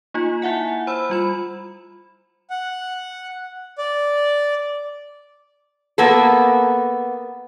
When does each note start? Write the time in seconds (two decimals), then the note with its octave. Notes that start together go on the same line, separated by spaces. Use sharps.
0.14 A#3 D#4 F4
0.42 E4 E5 F#5 G#5
0.87 C5 B5 E6
1.10 G3 F4 B5
2.50 F#5
3.78 D5
5.98 A#3 B3 A4